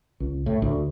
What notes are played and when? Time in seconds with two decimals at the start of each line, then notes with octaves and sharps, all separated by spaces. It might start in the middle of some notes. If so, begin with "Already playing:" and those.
0.20 C#2
0.46 A2
0.62 D2